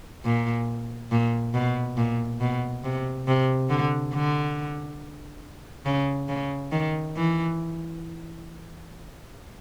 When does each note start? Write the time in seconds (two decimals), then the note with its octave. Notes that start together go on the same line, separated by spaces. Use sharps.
0.24 A#2
1.11 A#2
1.54 B2
1.97 A#2
2.41 B2
2.84 C3
3.27 C3
3.69 D3
4.13 D3
5.85 C#3
6.28 C#3
6.72 D#3
7.16 E3